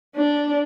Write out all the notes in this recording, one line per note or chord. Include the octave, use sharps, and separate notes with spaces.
D4